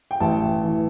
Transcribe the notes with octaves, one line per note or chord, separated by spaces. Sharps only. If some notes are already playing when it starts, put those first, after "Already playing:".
G5
A1 A5
E3